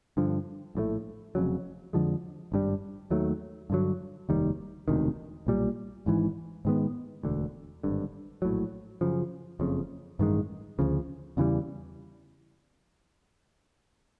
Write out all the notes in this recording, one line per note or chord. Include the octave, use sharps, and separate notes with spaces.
G2 D3 F3
A#1 A2 E3 A3
F1 F2 C#3 F#3
F2 D3 F3 G#3
G#1 G2 D#3 G3
D#2 D#3 F#3 A3
G2 D3 F#3
F1 D#2 D#3 G3
E1 D2 C3 D#3
B1 A#2 G3
G#1 G#2 E3
G#2 D#3 G#3 B3
E1 D2 D3
G#1 G2 D3
A#1 A2 F#3
F#2 C#3 F3
F#1 F2 C#3
A1 G2 D#3 G#3
D2 C#3 F3
E2 C#3 E3 G3